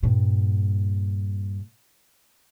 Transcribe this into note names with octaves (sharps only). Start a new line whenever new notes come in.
G2 A#2